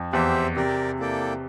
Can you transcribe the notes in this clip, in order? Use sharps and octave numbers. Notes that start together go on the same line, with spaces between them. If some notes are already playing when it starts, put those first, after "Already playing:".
Already playing: F2
E2 G4 C5 E5
C3 G4 A#4 D5
A#3 E4 A4 D5 G5